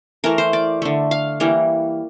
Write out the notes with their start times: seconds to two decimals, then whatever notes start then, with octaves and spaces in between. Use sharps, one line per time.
0.24 E3 A3 A#4
0.38 C5
0.53 D5
0.82 D3 A3
1.11 F5
1.40 E3 G3 A#3